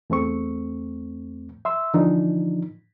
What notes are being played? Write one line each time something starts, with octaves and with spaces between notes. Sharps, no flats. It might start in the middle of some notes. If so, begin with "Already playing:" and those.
E2 A3 C4 C#6
E5 C6 E6
D3 E3 F3 D4 D#4